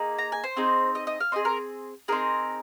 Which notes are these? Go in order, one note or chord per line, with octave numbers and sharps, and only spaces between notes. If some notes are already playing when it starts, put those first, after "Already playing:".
Already playing: A#3 D#4 G#4
A#5
G#5
C5
C4 D#4 G#4
D#5
D#5
F5
C4 G#4 D#5
A#4
C4 D#4 G#4 A#4